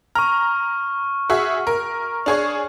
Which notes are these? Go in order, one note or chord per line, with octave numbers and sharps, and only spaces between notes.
A#5 C#6 F6
F#4 G#4 E5
A#4
D4 G#4 C#5